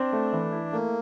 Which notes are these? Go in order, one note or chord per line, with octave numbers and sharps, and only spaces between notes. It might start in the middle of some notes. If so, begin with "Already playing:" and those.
Already playing: C4 D4
A3
E3
E4
A3 A#3